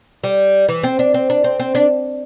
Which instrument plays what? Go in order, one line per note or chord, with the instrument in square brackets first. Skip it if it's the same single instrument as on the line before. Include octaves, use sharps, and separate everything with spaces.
[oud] G3
E3
C4
D4
C4
D4
C4
C4
D4